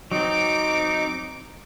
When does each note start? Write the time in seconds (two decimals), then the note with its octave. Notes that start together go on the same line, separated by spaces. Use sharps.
0.11 F#3 C4 D#4 D6